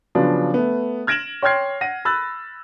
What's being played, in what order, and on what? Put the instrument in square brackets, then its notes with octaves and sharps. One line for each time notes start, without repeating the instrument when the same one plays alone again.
[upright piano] C#3 F3 F#3 B3 D4
A3 B3
F6 G#6 A#6 D7 E7 F#7
C#5 G5 C6 F6 G#6 C7
F#5 A#6 D#7
B5 E6 F#6 A6